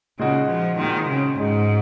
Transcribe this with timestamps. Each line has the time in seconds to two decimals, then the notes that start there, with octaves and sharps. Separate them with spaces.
0.19 A#2 C#3 G#3 D#4 F#4
0.49 F3
0.79 A#2 D#3 G#3 C4 F#4
1.09 C#3
1.39 G#2 C#3 G#3 D#4 F#4